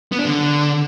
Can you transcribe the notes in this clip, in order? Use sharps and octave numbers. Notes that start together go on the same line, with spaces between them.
B3
D4
D3